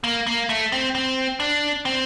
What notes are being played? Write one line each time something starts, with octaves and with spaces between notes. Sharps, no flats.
A#3
A#3
A3
C4
C4
D4
C4